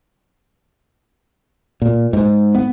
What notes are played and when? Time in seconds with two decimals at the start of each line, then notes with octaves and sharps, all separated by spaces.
1.82 A#2
2.13 G#2
2.55 B3